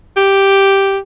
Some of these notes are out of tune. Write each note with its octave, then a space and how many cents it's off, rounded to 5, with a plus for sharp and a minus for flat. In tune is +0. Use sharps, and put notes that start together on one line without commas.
G4 +0